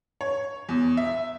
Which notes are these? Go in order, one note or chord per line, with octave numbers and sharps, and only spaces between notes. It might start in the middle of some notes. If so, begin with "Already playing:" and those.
C#5
E2
E5